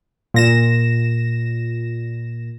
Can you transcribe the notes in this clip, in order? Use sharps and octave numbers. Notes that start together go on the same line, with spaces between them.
A#2 A#6 E7